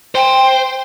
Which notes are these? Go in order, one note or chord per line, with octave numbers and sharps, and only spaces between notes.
C5 G5